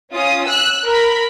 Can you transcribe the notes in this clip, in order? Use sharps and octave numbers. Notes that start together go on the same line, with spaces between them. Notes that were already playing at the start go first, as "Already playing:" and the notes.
C#4 F4 D#6
E6 F#6
A#4 B5